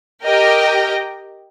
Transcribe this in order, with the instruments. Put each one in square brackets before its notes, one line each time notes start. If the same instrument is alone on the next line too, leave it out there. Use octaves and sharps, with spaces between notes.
[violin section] G4 A#4 D#5 G5